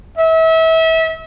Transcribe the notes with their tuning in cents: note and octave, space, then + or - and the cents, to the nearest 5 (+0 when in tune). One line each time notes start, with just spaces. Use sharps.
E5 -30